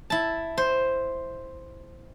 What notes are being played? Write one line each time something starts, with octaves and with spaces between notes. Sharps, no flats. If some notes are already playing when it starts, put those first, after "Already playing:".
E4 A5
C5